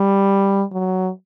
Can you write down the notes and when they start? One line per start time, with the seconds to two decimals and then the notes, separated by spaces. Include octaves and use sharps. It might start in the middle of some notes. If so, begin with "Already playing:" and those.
Already playing: G3
0.72 F#3